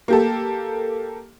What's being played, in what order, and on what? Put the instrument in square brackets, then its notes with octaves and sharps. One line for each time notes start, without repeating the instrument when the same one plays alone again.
[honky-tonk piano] A#3 G4 A4